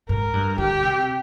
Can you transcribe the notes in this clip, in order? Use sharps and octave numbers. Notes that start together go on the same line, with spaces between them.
G#2 A#4
G2
D3 G4
C3